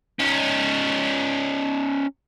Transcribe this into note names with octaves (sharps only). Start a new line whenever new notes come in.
C#4 D#4